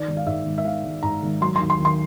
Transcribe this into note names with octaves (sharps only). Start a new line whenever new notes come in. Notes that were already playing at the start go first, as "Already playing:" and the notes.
Already playing: D#3 D5
G#1
F5
G#2 E5
G#1
E5
D#3 F5
G#1
G#2 A#5
G#1
F#3 C6
C6
D#2
C6
D#3
C6